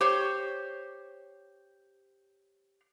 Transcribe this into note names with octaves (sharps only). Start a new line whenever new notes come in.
G4 C5 C#5